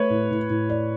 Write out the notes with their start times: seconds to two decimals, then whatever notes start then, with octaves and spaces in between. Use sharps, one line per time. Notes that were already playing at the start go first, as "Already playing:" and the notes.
Already playing: A3 B4 C#5
0.10 A2
0.31 A2
0.50 A2
0.69 D5